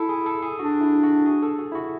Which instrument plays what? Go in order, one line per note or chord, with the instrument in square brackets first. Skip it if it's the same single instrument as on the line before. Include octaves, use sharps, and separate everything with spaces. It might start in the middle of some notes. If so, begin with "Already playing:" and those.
Already playing: [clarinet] E4 [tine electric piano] A4
[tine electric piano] G#4
A4
G#4
[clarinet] D4 [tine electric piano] F#4
[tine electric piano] E4
F#4
G#4
A4
F#4
E4
F#4